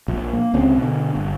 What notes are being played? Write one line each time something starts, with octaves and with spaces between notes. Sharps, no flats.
A#1
A#3
C#2 C#3 C4
B2 D3
G1